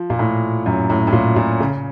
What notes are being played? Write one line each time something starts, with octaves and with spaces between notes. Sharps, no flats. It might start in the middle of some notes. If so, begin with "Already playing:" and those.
Already playing: F3
A#2
A2
F#2
A2
A2
A#2
A#2
C#3